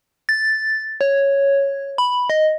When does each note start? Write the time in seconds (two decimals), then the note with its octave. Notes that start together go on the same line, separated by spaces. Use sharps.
0.29 A6
1.01 C#5
1.98 B5
2.30 D#5